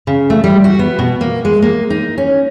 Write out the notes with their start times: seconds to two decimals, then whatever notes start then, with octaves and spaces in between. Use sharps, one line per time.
0.07 C#3
0.30 A3
0.44 G3
0.64 F#4
0.79 B3
0.99 B2
1.21 A#3
1.45 G#3
1.62 A#3
1.90 D#4
2.18 C#4